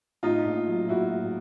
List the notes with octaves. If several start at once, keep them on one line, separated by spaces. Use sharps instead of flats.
A2 D#4 F4
A#1
F#3
A#1 E4 F#4
A2